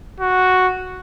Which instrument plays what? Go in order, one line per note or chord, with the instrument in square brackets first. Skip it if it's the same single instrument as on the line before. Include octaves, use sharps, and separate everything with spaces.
[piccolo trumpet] F#4